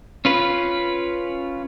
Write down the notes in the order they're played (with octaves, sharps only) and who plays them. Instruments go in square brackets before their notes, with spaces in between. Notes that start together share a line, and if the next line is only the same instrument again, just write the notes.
[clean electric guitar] C#4 F4 B4